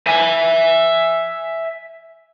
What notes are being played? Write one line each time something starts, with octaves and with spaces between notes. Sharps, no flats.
E5 G#5